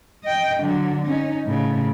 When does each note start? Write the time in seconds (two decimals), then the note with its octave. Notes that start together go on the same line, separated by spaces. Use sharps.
0.23 D#5 G5
0.60 D3 F#3
1.07 C#4 D#4
1.45 A2 C#3